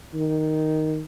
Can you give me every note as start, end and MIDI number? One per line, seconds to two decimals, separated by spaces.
0.14 1.03 51